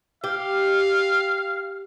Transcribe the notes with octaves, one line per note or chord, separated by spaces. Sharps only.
G4 F5